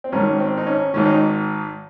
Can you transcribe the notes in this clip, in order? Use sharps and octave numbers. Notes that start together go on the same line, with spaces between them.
C4
G#1 G#2 D#3 C#4
C4
D#4
C#4
G#1 G#2 D#3 C#4
D#4